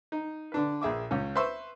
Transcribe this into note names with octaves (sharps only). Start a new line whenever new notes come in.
D#4
D3 D4 B4
A#1 G#4 E5 D6
C#2 C#4
B4 C5 E5 C6 C#6 E6